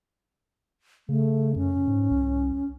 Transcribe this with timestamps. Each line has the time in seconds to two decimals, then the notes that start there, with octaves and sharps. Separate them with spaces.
1.09 C#3 A3
1.56 F#2 C#4
1.88 G#2
2.11 C2